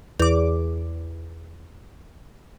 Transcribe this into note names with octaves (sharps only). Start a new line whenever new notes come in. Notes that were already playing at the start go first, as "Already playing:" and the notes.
E2 D6